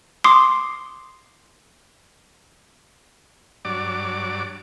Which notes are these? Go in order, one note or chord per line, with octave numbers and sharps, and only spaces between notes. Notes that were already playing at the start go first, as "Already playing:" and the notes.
C6 D6 D#6 C7
G2 F#3 D5 D6